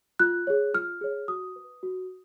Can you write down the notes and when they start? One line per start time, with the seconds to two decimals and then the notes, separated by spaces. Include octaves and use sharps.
0.19 F4 F#6
0.47 G#4 C#5
0.74 F4 F6
1.01 G#4 C#5
1.28 F#4 D#6
1.56 B4
1.83 F#4